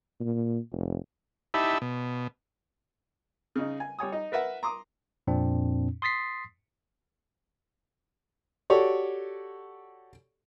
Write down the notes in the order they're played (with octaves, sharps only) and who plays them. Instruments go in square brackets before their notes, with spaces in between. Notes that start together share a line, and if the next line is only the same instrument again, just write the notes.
[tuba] A#2
F1
[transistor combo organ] D#4 E4 G4 E5 A5 B5
B2
[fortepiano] C#3 D#4
G#5
G3 C#5 G#5 D#6
D#4
A#4 B4 E5 F#5
A#5 C6 D6 D#6
[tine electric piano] F2 A#2 C4 D4
C6 D#6 A6 B6 C7
[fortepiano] F#4 G4 A4 C#5 D5